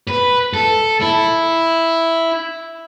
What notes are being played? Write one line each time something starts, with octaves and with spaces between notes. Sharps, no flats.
B4
A4
E4